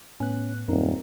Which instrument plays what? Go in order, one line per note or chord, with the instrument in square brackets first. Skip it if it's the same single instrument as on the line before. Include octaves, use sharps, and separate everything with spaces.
[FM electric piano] A2 B3 F#6 [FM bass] C#4
[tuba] D#1 [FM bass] F#2 [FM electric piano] C4 D#4 A#4